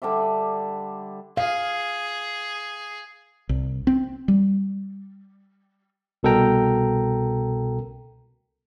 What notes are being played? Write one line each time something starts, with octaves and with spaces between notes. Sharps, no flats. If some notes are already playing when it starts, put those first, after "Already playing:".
D3 G3 D5 E5
G#4 F5
C2
C4
G3
C2 B2 A4 A#4 G5 A#5